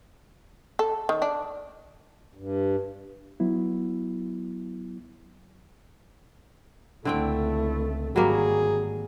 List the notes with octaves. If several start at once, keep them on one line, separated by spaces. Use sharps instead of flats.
A4
D#3
D4
G2
F#3 B3 E4
C#2 D3 A3 C4 E4 G5
G#1 F#3 G3 A#3 G#4